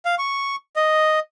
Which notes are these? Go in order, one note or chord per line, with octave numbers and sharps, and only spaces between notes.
F5
C#6
D#5